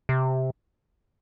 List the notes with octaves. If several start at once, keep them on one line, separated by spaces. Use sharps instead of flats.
C3